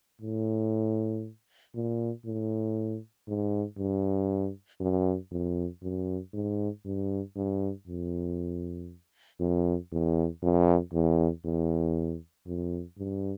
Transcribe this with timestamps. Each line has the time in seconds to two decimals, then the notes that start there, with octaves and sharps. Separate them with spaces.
0.22 A2
1.75 A#2
2.26 A2
3.28 G#2
3.78 G2
4.80 F#2
5.32 F2
5.83 F#2
6.34 G#2
6.86 G2
7.36 G2
7.87 F2
9.40 F2
9.92 E2
10.43 F2
10.93 E2
11.45 E2
12.47 F2
12.98 G2